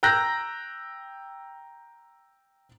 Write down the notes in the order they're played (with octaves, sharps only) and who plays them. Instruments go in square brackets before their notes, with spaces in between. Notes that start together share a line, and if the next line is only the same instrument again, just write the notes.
[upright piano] G5 A#5 E6 F#6 G6 A#6